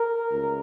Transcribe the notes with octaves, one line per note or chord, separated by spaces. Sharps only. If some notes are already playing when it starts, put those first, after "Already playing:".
Already playing: A#4
C#2